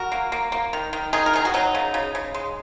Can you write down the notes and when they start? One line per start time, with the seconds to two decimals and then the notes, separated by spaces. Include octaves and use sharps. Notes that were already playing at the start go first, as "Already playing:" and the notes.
Already playing: F#4 A#4
0.12 A#3
0.32 A#3
0.52 A#3
0.73 D#3
0.93 D#3
1.13 D#3 D#4 G#4
1.26 A#4
1.33 D#3 G#4
1.45 F#4
1.54 F#3 D#4
1.75 C#3
1.94 C#3
2.15 C#3
2.34 G#3